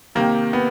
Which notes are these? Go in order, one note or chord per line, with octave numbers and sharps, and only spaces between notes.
C3 D#3 A#3
B3